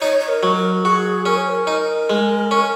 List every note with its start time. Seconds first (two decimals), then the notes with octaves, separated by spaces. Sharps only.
0.01 D#4 C#5
0.20 C#5
0.28 A#4
0.43 F#3
0.56 A#4
0.84 F#4 G#4
1.26 C#4 A#4
1.38 C#5
1.49 A#4
1.67 D#4
2.10 G#3
2.51 C#4